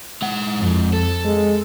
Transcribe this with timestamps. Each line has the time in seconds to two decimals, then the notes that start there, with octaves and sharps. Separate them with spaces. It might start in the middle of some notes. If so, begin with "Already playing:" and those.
0.22 G#3 F#5
0.57 F2
0.93 A4
1.24 G#3